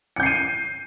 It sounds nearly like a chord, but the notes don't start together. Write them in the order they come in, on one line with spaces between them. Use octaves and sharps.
C#7 G6 C7 D#7